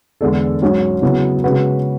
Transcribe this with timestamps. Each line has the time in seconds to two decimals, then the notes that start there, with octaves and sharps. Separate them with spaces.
0.21 E2 D3 G#3 D4 A4
0.62 G#2 F#3 C#4
1.02 C#3 F#3 B3 E4
1.44 C#3 G#3 C#4 F#4 B4